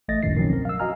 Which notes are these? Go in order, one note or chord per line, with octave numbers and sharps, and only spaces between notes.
A1 A3 D#5 A6 A#6
G#1 C#2 F#2 A2 D#3 C7
B2 D#3 F3 F#3 C4 C#4
A#4
F5 E6
F#4 D#5 F5 G#5 A#5 F6